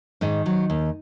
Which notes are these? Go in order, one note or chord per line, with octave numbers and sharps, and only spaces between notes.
G#2 D#3 D#4
F#3
D#2